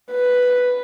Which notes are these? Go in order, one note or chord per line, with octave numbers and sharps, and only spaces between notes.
B4